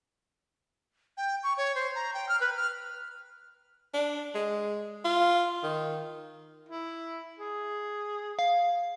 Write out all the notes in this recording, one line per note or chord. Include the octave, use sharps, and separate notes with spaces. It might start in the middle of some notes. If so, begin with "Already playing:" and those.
G5
C#6
C#5
C5
A#5
G5
F6
B4
F6
D4
G#3
F4
D#3
E4
G#4
F5